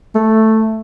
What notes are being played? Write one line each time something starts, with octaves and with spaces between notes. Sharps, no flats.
A3